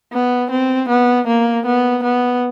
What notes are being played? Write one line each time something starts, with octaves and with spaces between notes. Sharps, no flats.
B3
C4
B3
A#3
B3
B3